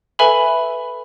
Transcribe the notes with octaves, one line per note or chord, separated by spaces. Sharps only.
A4 B4 E5 G#5 B5